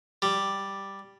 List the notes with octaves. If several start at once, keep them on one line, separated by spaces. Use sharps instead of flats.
G3